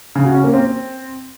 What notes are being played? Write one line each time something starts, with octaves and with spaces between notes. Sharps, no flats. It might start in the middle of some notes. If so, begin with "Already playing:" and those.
C#3
F#4
C#4
A#3
C4